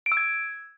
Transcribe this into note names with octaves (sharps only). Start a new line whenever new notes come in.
D7
E6
G#6